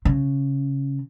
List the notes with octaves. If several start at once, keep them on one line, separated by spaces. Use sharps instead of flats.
C#3